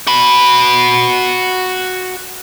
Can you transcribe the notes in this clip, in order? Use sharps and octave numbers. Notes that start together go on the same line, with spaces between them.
F#4 B5